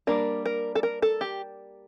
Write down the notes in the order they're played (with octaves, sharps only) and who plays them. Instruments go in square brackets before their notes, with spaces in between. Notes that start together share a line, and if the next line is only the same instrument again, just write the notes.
[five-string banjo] G3 A#3 D4 A#4
A#4
A4
A#4
A4
G4